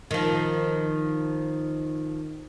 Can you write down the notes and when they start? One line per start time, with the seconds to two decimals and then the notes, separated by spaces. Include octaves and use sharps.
0.11 D#3 F3